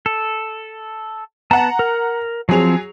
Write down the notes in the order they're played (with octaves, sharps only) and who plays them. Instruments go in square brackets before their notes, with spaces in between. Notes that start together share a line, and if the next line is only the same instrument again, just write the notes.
[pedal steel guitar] A4
[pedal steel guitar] B3 A5 [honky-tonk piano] F#5 A#5
[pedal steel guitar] A#4
[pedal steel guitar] F3 C4 [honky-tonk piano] F#3 G#4 F7